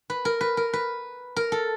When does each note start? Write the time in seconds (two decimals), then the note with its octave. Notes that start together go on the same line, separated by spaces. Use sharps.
0.10 B4
0.25 A#4
0.41 B4
0.57 A#4
0.73 B4
1.36 A#4
1.52 A4